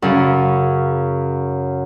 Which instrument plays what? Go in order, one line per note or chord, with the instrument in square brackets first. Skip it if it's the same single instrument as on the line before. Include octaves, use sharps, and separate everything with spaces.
[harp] F#2 C#3